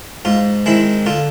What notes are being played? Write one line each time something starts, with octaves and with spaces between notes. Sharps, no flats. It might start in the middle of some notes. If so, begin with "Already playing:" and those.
G#2 F4
D#3 G#3 C4 E4
D3 F4